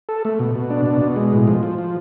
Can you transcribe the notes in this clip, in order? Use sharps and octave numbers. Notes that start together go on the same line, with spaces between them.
A4
A3
B2
B2
D4
B2
B2
G#3
A2
F3
F3
F3